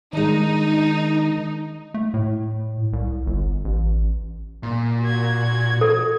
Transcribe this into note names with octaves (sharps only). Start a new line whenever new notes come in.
D#3 G#3 D4 D#4
A3
A2
C2
G1
A1
A#2
F#4 G#6
A4